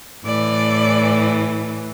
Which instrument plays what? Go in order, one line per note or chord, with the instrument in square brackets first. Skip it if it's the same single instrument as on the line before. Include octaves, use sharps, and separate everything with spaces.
[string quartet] A2 E3 D5